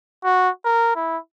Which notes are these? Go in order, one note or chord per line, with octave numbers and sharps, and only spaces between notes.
F#4
A#4
E4